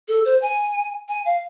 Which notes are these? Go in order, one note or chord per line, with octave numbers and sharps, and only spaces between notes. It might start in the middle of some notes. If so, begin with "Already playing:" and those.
A4
C5
G#5
G#5
F5